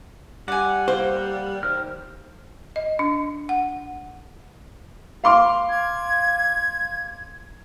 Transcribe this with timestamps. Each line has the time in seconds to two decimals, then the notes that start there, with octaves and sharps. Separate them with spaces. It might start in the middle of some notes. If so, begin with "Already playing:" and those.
0.48 G3 D5 F#5 G#5
0.88 A#3 C5
1.63 D#3 C5 F6
2.76 D#5
2.99 D4
3.49 F#5
5.24 F5 C6 D6
5.70 G#6